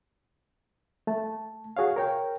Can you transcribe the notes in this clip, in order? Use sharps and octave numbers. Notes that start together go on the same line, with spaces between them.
A3 A5
F#4 G#4 C#5 F5
A#4 C#5 G5